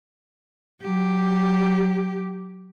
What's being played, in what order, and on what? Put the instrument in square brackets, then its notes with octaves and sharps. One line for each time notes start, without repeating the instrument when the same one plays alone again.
[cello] F#3 G4